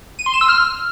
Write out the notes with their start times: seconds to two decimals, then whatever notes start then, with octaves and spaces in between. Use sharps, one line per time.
0.19 D#7
0.26 C6
0.34 E7
0.41 E6
0.49 F6